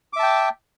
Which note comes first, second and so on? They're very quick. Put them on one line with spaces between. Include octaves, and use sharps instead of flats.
D6 E5 A5 G5